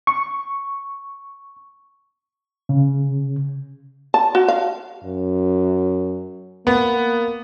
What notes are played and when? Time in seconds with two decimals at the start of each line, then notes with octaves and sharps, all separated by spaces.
0.07 C#6
2.69 C#3
4.14 A5
4.35 F#4
4.48 F5
5.04 F#2
6.67 A#3 B3